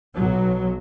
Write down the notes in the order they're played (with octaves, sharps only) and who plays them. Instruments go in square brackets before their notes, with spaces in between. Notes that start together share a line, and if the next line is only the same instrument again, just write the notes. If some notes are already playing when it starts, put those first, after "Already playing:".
[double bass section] B1 F#3